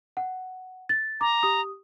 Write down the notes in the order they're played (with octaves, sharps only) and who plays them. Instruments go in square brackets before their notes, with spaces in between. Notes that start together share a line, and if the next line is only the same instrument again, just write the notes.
[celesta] F#5
A6
[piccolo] A#5 [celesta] D6
[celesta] G4 D#6